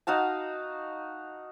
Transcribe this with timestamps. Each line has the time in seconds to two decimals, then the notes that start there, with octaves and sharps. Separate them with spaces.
0.07 D#4 F#4 F5 A5